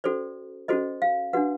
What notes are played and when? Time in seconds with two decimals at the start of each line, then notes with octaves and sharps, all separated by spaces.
0.04 C#4 F#4 A4 C5 D5
0.68 C#4 F#4 A4 C5 D#5
1.02 F5
1.33 D4 F#4 B4 F#5